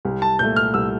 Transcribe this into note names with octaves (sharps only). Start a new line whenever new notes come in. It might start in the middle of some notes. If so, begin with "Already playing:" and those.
C2
A5
A#2 A3 G6
F6
C2 E6